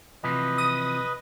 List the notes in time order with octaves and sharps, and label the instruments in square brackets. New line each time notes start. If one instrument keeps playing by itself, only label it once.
[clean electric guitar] C3 E3 F3 [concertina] B4 D#5
[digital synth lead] D#6